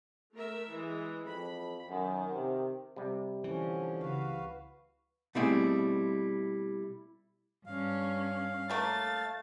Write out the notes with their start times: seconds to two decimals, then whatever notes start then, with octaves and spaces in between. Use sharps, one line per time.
0.34 A3 A#4 E5
0.69 E3 G#3
1.25 F2 B5
1.89 F#2 D#3
2.33 C3
2.96 C3 G3
3.44 D3 E3 F3 C#4
4.01 C#2 C#3 F#4 B4 F5
5.35 B2 G3 A3 C4 E4 G#4
7.66 G2 C#4 F5
8.70 F#3 A3 A#3 A6